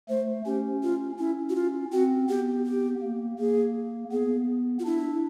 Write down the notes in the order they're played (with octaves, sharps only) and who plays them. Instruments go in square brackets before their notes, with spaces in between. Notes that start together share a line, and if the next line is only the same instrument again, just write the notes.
[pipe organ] A3 [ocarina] C5
[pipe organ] C#4 [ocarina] G4
[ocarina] F4
[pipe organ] C#4 [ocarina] E4
[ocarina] F#4
F4
[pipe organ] C4 [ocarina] F#4
[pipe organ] B3 [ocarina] G4
[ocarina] G4
[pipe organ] A#3
[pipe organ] A#3 [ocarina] G#4
[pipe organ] B3 [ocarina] G#4
[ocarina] F4
[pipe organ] D4 [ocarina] E4